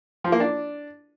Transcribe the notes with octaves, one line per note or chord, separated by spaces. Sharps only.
F3
A#3
D4